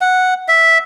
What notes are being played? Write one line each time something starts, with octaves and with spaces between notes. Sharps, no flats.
F#5
E5